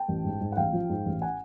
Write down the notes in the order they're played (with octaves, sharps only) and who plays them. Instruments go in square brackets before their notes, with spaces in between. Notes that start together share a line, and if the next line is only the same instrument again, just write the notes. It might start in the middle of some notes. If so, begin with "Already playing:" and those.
Already playing: [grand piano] G5 A5
A1
G#2
G#2
F#5
A1 F5 G5
F3
G#2
A1
F#5 G#5